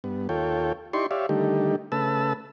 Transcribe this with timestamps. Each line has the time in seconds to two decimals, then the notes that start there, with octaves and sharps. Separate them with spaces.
0.04 G2 B3
0.29 D#2 F4 A4 C#5 G5
0.93 D#4 E4 G4 D5 C6 C#6
1.11 G4 C#5 D5 E5 F5
1.29 D3 D#3 G3 A3 D#4 G4
1.92 C#3 A3 B4 A5 E6